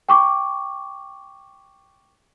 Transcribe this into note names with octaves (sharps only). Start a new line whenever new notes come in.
G5 C#6 D6